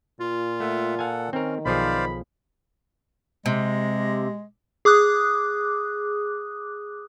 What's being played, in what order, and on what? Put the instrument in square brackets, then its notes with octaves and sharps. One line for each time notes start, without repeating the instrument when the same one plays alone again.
[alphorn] A#2 [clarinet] F4
[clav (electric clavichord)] A3 [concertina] E5 F#5
[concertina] A4 F#5 [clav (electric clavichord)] F5 G#5
[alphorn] D#3 [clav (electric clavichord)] C4 A#4 [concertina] C#4
[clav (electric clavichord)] B1 F3 G#4 [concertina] C5 D5 F5 [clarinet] B5
[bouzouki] C3 [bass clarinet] G#3
[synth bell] G#4 D6 D#6 F#6